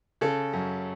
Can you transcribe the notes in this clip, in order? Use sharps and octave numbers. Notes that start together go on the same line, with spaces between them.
C#3 A4
F#2